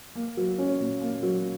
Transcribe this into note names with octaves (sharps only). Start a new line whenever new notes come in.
A#3
F#3
C#4
A#2
A#3
F#3